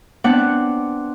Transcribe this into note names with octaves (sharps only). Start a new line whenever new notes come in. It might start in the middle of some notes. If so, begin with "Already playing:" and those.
B3 C4 D4 F#5 D6